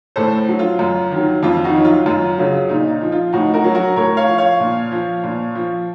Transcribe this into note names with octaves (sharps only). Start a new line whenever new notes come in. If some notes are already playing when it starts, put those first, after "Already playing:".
A2 A4 C5
F#3
F4
F#2
D#3 F#3
F2 F4
D#4 F#4
D#3 F#3
F4
F#2 F4
C#3 F#3
A#2 D#4
D#4
F3
F4
A2 D#4 F#4
F#4 A#4
F#3
F#4 A#4
A2 A#4 C#5
C#5 F5
F3
C#5 F5
A#2
F3
A#2
F3